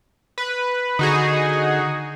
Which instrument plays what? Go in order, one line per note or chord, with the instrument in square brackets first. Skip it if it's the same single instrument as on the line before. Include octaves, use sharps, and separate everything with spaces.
[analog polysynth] B4
[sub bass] D3 [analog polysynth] D#4 F#4 G#4